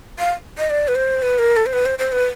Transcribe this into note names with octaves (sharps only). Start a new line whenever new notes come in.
F5
D#5
D5
B4
C5
B4
A#4
A4
C5
B4
C5
C5
B4